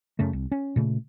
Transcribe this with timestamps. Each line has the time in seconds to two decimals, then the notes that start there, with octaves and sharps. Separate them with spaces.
0.19 F#2 C#3 A3
0.33 C2
0.52 C#4
0.76 A#2 C#3 A3